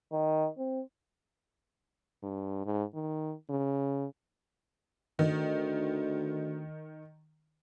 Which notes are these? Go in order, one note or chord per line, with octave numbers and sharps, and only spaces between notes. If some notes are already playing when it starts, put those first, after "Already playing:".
D#3
C4
G2
G#2
D#3
C#3
D2 D#3